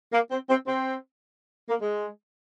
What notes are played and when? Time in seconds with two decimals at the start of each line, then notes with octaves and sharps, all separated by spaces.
0.13 A#3
0.31 C4
0.49 C4
0.67 C4
1.69 A#3
1.81 G#3